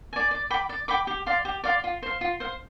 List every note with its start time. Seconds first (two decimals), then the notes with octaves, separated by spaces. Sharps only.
0.13 D5 G#5
0.31 D5
0.50 G5 B5 D6
0.69 D5
0.88 G5 B5 D6
1.07 G4
1.26 D5 F5 C6
1.45 G4
1.64 D5 F5 C6
1.84 F4
2.03 C5 F5
2.21 F4
2.40 C5 F5